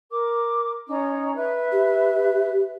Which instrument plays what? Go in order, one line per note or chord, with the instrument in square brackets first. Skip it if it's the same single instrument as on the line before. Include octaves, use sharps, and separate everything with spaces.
[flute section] A#4 D6
C#4 D#4 A#5
B4 E5
[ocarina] G4